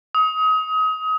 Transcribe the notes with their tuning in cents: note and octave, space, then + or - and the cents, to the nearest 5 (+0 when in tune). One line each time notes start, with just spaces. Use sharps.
D#6 +30